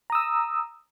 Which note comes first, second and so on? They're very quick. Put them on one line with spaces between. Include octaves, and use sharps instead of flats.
A#5 D#6 E6